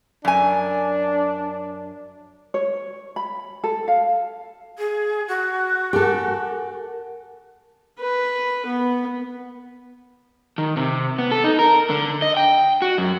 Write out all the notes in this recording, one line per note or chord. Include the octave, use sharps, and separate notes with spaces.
F#2 D4 G#5
C#5
B5
A4
F5
G#4
F#4
G4 A4 A#4 F#5 G#5
B4
B3
D#3
C3
B3
A4
D#4
A#4
D3
D#5
G5
F#4
F#2